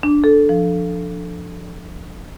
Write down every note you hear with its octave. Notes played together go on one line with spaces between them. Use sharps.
D4
A4
F3